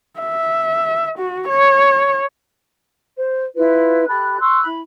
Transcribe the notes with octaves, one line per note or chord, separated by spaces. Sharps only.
E5
F#4
C#5
C5
E4 F4 B4
G4 A4 B5 F#6
C6 C#6 E6 F#6
E4 B5